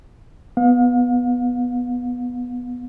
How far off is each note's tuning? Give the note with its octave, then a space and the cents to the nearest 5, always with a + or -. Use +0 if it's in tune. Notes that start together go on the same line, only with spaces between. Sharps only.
B3 +0 F5 +40